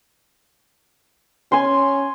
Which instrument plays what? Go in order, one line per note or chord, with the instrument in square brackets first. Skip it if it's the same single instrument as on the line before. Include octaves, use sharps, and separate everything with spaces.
[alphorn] C#4 [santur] G#5 C6